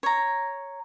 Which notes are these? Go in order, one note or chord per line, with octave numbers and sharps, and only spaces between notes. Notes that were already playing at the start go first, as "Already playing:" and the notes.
C#5 A#5